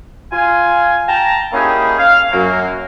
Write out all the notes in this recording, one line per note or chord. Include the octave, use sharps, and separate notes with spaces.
F4 G#5
G5 A5 A#5
A#3 C#4 D#4 E4 G4 G#4
F5
F#2 F#3 A#3